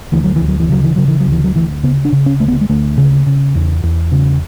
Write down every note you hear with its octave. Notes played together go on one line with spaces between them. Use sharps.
D2 E3
F#3
D2 E3
F#3
E3
C#3 F#3
E3
C#3 F#3
E3
F#3
D2
E3
F#3
D2 E3
C#3 B3
D4
C#3
C#4
D2 A3
B3
G#3
D2 A3
C#3
C#3
E2
E2
C#3